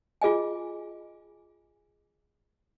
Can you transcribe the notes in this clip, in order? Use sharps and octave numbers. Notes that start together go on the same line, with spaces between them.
F4 G#4 D#5 G#5